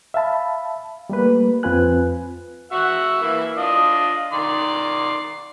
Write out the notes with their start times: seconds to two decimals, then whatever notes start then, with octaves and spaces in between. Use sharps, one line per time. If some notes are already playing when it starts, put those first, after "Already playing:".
0.14 E5 F5 A5 B5
1.10 G3 A3 A#3 B4
1.63 F2 C4 F4 B4 G#5 F#6
2.72 F#4 E5 F#5
3.22 E3 A#3 E4
3.57 D4 F4 D#5
4.33 D#3 D5 C6